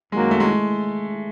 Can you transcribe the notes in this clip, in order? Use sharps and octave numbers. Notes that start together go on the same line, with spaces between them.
F#2 D#3 F#3 G#3 A#3
A3
G#3